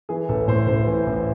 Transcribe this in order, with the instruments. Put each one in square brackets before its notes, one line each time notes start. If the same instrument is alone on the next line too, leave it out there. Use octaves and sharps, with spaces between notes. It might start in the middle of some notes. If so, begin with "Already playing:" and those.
[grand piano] E3 G#4
A1 A4
A2 C5
A1 C5
E3
A1